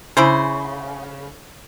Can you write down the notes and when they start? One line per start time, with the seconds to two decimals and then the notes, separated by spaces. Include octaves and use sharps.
0.17 C#3 E4 G#4 C5